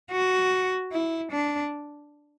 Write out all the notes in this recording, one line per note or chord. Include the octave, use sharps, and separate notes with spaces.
F#4
E4
D4